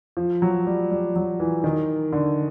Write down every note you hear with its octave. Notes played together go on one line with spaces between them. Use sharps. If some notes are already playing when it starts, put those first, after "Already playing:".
F3
F#3
G3
G3
F#3
E3
D#3
D3